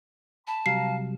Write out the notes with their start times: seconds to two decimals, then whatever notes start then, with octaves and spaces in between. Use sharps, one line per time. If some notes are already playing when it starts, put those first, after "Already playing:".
0.47 A5 B5
0.66 C3 F#3 G3 F5 A#5 C7